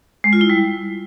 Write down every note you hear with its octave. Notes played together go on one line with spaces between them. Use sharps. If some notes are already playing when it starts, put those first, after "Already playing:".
G#3
F4
E4
G3